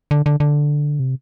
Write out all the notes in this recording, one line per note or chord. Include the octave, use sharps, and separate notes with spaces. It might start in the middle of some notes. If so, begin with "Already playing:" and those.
D3
D3
D3
C3